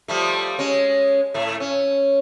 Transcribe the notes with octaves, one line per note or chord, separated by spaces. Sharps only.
F3 G3 A3
G#3 C#4
A2 A3
C#4